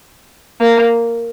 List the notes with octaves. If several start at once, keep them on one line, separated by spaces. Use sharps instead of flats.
A#3